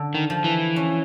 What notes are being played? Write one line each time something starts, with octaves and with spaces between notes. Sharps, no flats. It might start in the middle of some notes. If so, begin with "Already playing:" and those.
Already playing: D3
D#3
F3
E3
C#4